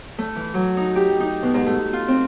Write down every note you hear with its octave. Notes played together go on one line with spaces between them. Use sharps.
A3
E3
F#3
D#4
G4
D#4
B2
G#2
A3
F4
C4